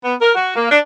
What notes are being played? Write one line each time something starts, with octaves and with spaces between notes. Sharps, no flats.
B3
A#4
F#4
A#3
D4